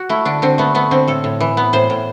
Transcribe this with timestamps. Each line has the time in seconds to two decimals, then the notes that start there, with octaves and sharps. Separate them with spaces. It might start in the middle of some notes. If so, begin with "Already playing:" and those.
Already playing: F#4
0.09 A3 E4
0.25 D3 D4
0.42 D3 C4
0.58 A3 B3
0.75 A3 B3
0.91 D3 C4
1.08 A2 A4
1.24 A2
1.40 E3
1.57 B3
1.73 A2 C5
1.90 A2